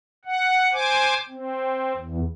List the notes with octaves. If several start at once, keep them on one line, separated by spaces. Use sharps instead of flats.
F#5
C5 G#5 D6
C4
E2